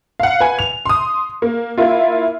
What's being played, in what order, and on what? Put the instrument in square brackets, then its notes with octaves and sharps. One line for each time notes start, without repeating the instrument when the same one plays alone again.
[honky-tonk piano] F5 F#5
B4 G#5
F7
C6 D#6
A#3
A#3 E4 F4